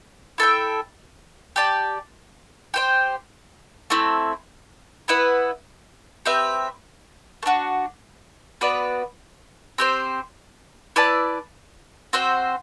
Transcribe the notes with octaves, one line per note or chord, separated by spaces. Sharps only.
E4 A4 E5 G5
G4 D5 A5
G4 C5 G5
A3 C4 E4
B3 E4 B4 F#5
C4 G4 B4 E5
A3
D4 F#4
B3 F#4 B4 D5
C4 G4 C5
E4 B4 D5 A5
C4 F#4 C5 G5